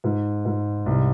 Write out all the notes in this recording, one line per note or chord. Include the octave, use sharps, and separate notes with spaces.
G#2
G#2
C2